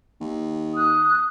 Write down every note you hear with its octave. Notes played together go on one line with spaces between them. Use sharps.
D#2
D#6 F#6